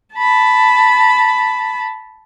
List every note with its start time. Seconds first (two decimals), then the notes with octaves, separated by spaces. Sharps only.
0.15 A5 B5